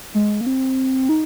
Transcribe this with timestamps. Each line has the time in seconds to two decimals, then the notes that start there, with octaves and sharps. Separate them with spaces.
0.15 G#3
0.41 A#3
0.46 C4
1.09 D#4